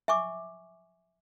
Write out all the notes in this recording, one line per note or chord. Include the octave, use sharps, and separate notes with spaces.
E5 G#5 C#6 D6